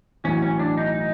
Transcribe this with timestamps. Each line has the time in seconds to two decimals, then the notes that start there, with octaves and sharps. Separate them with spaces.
0.24 B1 A2 E3 C#4
0.42 C#4
0.59 D4
0.77 D#4
0.94 D#4